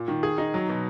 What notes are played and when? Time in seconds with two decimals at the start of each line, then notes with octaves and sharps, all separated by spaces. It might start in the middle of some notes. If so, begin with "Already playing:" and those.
Already playing: A#2
0.08 D#3
0.23 G#4
0.38 D#4
0.54 F#3
0.69 B2